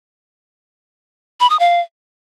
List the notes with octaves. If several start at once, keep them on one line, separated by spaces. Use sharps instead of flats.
B5
D#6
F5